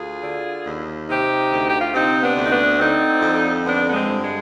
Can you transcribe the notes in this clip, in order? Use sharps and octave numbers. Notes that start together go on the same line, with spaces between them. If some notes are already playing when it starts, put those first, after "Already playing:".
Already playing: D2 F4 G#4
D3
D#2
C3 D#4 G4
D2
G4
F4
C3 C4 D#4
B3 D4
D2
D#4
B3 D4
D3 C4 D#4
F2
D3 B3 D4
B3
G#3 C4
G2
G#3